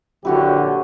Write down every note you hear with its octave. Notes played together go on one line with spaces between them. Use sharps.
A#1 D3 F#3 E4 F#4 G4 C#5